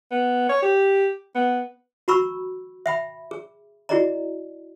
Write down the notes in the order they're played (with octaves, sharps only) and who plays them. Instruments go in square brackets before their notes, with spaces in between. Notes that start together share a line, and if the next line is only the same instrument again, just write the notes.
[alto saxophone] B3
C#5
G4
B3
[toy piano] F#4 A#5 B5 C#6 E6
E5 G5 B5
G#4
E4 F#4 G#4 D5 D#5 A#5